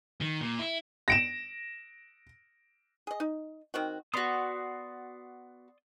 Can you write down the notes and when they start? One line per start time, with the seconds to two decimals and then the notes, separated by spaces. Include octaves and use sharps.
0.21 D#3
0.41 A#2
0.59 E4
1.08 A#6 D7 E7
3.07 G#4 D#5
3.20 D#4
3.74 D#3 C4 F#4
4.14 B3 F#4 D5 C6 D#6